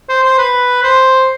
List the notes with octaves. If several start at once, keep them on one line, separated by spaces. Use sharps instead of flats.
C5
C5
B4
C5